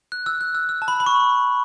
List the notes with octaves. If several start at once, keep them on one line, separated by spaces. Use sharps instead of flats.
F#6
E6
F#6
E6
E6
A5
B5
B5
C#6